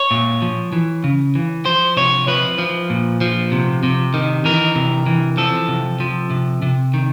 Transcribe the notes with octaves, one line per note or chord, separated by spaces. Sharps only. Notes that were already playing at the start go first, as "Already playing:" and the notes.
Already playing: C#5
A#2
F3
E3
C#3
E3
F3 C5
C3 C#5
F3 B4
F3
A#2
F3
C3
C3
D#3
E3 A#4
C3
E3
F3 A4
C3
F3
C3
C3
D#3